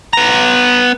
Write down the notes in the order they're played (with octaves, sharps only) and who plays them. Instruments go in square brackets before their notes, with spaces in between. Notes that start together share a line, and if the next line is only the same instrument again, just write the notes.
[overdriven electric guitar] B3 A#5